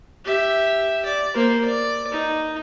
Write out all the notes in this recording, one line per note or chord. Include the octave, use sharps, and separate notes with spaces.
G4 E5
D5
A#3 C5
D5
D#4